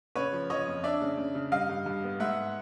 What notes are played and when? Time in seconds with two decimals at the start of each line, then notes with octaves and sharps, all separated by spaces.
0.15 C#3 B4 C#5
0.33 F3
0.50 F3 C#5 D#5
0.68 F2
0.84 D4 D5 E5
1.01 C#3
1.18 C#3
1.35 C#3
1.52 G2 D#5 F5
1.69 G2
1.86 G2
2.04 B3
2.20 G#2 E5 F#5